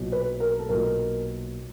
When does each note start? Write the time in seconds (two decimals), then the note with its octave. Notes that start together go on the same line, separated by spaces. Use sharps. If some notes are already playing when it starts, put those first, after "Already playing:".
Already playing: B1 A#2
0.12 B4
0.40 A#4
0.59 A4
0.69 B1 A#2 A#4